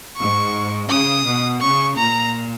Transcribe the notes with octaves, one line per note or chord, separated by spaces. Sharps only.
G#2 C#6
C#3 D#6
B2
C#3 C#6
A#2 A#5